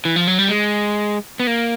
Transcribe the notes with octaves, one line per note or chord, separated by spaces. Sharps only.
E3
F3
F#3
G3
G#3
B3
A#3